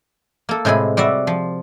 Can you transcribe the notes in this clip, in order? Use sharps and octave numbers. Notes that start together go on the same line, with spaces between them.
A#3 A4
A2 C3 G#3 G#5 B5
G3 F#4 D5 E5
F3